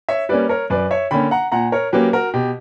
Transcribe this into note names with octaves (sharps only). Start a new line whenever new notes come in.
C#5 E5
G3 A#3 C#4 B4 D5
A#4 C#5
F#2 B4 D5
C#5 E5
D3 A#3 C#4 G5 B5
F#5 A#5
A#2 F#5 A#5
A#4 C#5
F#3 A#3 C#4 G4 B4
F#4 A#4
B2 G4